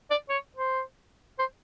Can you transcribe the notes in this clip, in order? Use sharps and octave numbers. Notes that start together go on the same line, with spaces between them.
D5
C#5
C5
C5